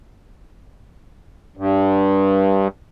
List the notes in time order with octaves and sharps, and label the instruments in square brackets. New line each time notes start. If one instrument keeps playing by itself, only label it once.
[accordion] G2